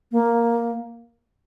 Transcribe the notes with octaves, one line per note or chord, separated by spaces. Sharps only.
A#3